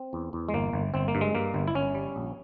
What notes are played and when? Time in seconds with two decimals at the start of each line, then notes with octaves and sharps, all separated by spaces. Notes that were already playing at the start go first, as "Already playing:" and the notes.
Already playing: C4
0.13 E2
0.33 E2
0.49 G#3
0.54 G1 A#3
0.73 G1
0.94 G1 C4
1.08 A#3
1.15 G2
1.21 G#3
1.35 G2 A#3
1.54 G1
1.68 E4
1.75 G1 C#4
1.95 G3
2.16 A#1